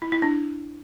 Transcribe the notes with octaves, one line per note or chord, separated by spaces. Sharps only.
E4
E4
D4